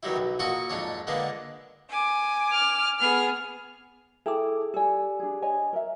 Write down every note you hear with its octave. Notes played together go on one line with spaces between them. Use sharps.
E2 D#3 F#3 G3 E4
B1
A#2 F#4 A4 C#6 D#6
F2 G#2 D4 C#5
D3 G#3 A#3 B3 D4
G#5 D6
F6
B3 G#4 F6
E4 G#4 A4 G5 A5 D6
G4 A4 D5 G#5
D4 G#4
C#5 D#5 G#5
A#4 E5